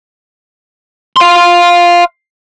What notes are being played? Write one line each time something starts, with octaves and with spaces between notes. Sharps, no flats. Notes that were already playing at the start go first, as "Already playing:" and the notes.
F5 C6